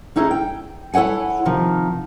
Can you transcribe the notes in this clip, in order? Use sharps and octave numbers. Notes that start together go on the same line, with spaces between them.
C#4 D#4 E4 G#4 A4
G5
E4 A4 C#5 F#5 G#5
C3 D#3 F3